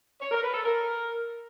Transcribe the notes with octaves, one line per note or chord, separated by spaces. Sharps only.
C#5
A#4
B4
A4
A#4